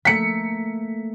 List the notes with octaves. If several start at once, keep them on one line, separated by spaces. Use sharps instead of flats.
A3 A#3 B6 C#7